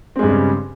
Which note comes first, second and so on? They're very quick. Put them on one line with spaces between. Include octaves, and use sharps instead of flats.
C4 G#3 G2 G3 C#3